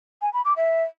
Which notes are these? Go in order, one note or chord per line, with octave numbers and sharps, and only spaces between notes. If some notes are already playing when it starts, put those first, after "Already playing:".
G#5
B5
D6
E5